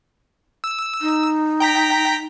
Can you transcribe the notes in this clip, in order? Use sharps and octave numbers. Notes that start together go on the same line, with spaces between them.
E6
D#4
G5 A#5 B6